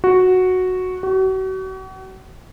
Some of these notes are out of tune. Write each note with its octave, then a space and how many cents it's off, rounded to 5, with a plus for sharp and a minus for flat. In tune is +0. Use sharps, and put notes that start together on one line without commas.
F#4 -5
F#4 +40